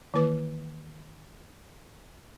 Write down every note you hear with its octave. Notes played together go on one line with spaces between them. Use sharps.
D#3 E3 A#3 E4 B4 D6